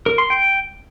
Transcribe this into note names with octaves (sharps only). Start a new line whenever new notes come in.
A#4
C6
G5